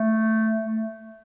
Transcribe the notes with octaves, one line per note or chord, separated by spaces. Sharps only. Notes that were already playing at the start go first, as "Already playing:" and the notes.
Already playing: A3
A3